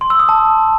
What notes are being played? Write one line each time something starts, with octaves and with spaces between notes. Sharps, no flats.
C6
E6
D#6
A5